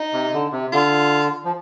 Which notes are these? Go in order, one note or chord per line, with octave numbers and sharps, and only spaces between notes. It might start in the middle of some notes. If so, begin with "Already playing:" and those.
Already playing: D#4
C3
D3
C3
D3 F4
F3